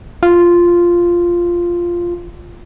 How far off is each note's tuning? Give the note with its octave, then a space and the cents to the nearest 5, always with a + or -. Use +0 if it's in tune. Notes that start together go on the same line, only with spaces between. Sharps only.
F4 -5